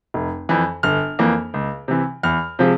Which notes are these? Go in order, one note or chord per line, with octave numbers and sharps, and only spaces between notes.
F1
F2 E3
G1 F6
F2 E3 A#3
C#2
C3 E3
E2 F6
C3 F3 G#3